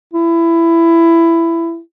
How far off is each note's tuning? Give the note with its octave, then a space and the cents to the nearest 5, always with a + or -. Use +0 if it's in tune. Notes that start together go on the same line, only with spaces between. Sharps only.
E4 +15